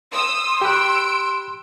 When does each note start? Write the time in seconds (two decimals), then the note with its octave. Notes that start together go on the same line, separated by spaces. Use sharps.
0.13 C6 D#6 E6
0.61 G4 B5 E6 F#6 D7